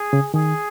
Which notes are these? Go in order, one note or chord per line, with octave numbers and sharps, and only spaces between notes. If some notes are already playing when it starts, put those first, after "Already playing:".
Already playing: G#4
C#3
D#3 G#4